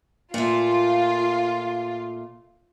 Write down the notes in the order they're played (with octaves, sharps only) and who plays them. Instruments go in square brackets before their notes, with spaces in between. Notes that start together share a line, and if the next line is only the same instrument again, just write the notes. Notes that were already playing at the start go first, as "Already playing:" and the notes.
[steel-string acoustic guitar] A#2 A3 [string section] F4